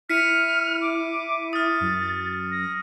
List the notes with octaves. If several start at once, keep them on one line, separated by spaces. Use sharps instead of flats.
E4 F6 B6 C#7 D#7
D6
D#6 F6 A6
F#2
A#6